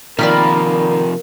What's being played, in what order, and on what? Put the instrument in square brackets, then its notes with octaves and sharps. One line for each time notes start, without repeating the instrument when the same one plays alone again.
[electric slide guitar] C3 F3 [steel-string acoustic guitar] D#3 [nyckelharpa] A#3 [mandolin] D5 B5 F6